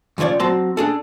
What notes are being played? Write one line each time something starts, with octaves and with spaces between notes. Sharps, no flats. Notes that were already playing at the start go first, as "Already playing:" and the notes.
F2 C#3 F3 C#5 D5
F#3 C4 A5 C6
D4 G#4 A4